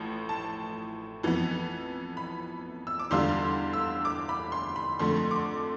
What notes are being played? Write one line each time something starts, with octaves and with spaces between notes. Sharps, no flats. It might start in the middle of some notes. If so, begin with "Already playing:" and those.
Already playing: A1 A2 F3
A5
F2 E3 B3
B5
E6
D6
E2 D3 G3 D4 F4 C6
E6
D6
B5
C6
B5
F2 D3 A3 C6
D6